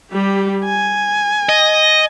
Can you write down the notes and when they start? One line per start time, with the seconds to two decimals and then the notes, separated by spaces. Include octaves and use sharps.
0.12 G3 G4
0.65 G#5
1.49 D#5